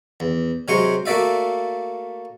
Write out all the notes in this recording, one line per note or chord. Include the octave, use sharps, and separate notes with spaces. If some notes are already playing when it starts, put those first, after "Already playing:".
E2
C3 F#3 G#3 C5 C#6
A3 A#3 F#4 D5 E5 F5